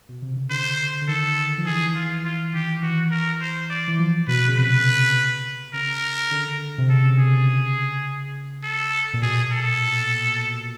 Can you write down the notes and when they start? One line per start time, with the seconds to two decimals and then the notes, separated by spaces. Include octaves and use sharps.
0.09 B2
0.22 C3
0.36 C#3
0.50 D3 C5
1.02 D3
1.08 D#3 A4
1.58 F3
1.66 E3 G#4
1.96 F4
2.24 E3 F4
2.54 D#3 G4
2.82 E3 F#4
3.11 A#4
3.41 C5
3.70 D5
3.88 E3
3.99 F3
4.28 B2 B4
4.47 C#3
4.56 C3 B4
5.73 C#3 A#4
6.31 D3
6.78 C3
6.89 C#3 A4
7.19 G#4
8.63 A4
9.14 A#2
9.22 B2 G#4
9.52 A4